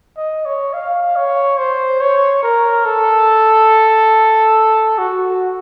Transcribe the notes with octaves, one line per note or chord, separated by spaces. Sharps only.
D#5
C#5
F5
C#5
C5
C#5
A#4
A4
F#4